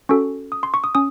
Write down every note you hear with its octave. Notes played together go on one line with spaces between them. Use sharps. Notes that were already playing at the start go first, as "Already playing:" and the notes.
C#4 F#4 A4 C#6
D#6
C6
C#6
D#6
C#4 D#6